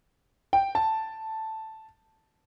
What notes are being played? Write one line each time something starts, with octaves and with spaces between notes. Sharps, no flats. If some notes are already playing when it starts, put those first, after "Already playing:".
G5
A5